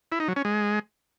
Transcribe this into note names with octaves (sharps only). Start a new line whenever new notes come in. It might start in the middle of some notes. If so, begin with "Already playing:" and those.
E4
D#4
F#3
C#4
G#3